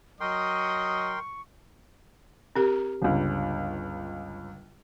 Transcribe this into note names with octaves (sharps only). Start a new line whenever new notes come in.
F#3 A#4 D#5 G5 C6 C#6 D#6
C4 G4 A#4
G1 C#2